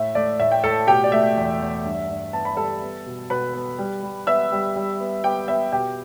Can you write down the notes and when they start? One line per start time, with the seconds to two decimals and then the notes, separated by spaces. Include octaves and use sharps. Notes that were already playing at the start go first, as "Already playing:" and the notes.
Already playing: A2 A3 E5
0.15 A3 D5
0.40 A2 E5
0.52 G5
0.64 A2 A4 A5
0.87 B2 G4 G5
1.04 D5
1.12 A3 E5
1.36 E2
1.60 E2
1.85 G2
2.09 G2
2.33 B3 A5
2.45 B5
2.57 G3 A4 A5
2.82 B3
3.06 B2
3.30 B2 B4 B5
3.54 B3
3.79 G3
4.03 G3
4.27 B3 E5 E6
4.52 G3
4.76 G3
5.00 B3
5.24 B3 G4 G5
5.48 B3 E5
5.72 B2 G4 G5